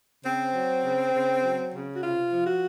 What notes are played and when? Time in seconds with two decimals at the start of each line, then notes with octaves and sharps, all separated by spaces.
0.24 C#3 C4
0.55 F#3
0.84 C#3
1.13 C#3
1.43 F#3
1.73 C#3
1.94 F#4
2.02 C3 F4
2.32 F3
2.46 F#4